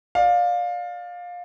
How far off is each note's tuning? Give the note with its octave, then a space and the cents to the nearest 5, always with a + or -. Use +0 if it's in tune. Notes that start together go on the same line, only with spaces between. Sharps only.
D5 +10 F5 +20